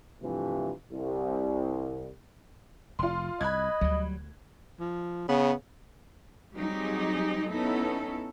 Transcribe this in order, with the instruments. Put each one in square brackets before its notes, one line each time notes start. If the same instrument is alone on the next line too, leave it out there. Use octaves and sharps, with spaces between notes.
[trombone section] G2 C3 E3 F3 A3
C2
[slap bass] F1 [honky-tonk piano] F4 C6
[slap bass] C2 [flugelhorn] D#5 [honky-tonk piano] B5 F#6 G#6
[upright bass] D2 [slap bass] F#3 G3
[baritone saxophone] F3
[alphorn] C#3 [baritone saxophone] B3
[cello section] F#3 G3 C4 D#4 G4 G#4
B3 C#4 D#4 E4 A4